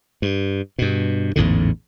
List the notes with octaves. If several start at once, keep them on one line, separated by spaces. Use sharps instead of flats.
G2
G2 B2
A1 E2 G#2 D3